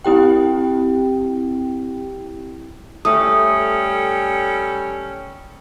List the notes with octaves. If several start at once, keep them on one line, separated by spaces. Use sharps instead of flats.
C4 E4 G4 G5
G3 A3 C#4 A4 D#6